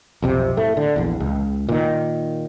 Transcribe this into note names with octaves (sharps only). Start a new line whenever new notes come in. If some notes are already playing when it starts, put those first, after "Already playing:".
B1 F2 C3
A2 A3
D3
A#1 E2
C#2
A#2 D#3